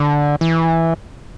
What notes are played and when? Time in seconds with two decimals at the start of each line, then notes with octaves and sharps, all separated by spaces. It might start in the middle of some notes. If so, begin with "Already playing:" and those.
Already playing: D3
0.41 E3